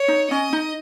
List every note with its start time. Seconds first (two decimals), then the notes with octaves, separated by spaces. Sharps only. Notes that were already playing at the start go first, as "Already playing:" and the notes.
Already playing: C#5
0.08 D#4
0.31 C#4 D#5
0.53 D#4